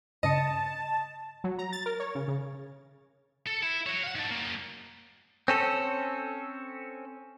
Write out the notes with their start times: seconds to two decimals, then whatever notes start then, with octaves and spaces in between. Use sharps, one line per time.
0.23 G2 C#3 D#5 A5 C#7
1.44 F#3
1.59 A#5
1.72 A6
1.86 A#4
2.00 C#5
2.15 C#3
2.28 C#3
3.47 A4
3.63 E4
3.86 F#4 C#5
4.04 F5 F#5
4.16 D#3 A4
4.31 F#3 A#3
5.48 C4 C#4 A4